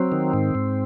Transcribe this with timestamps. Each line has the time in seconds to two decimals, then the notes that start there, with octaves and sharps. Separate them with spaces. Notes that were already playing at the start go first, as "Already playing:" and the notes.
Already playing: F#3 C4
0.12 D#3
0.33 G#2
0.55 G#2